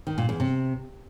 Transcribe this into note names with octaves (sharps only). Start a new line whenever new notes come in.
D#3
A#2
E2
C3